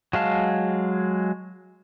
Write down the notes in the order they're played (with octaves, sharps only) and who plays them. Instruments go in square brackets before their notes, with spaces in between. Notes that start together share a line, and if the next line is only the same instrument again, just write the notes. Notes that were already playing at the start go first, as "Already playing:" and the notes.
[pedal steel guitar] F#3 G#3 F5 A5